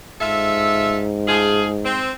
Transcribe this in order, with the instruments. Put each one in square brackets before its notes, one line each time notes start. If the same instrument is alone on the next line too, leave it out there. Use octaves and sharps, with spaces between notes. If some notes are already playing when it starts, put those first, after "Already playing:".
[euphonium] G#2 [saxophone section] F4 A4 E5
[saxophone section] A3 F4 G#4
C4